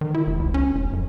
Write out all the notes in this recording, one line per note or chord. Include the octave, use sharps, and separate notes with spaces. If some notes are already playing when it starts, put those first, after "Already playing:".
D#3
E4
F1
C#2
C#4
F1
F#2